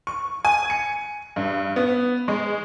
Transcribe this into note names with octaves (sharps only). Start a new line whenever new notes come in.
C#6
G#5
C#7
G2
B3
G#3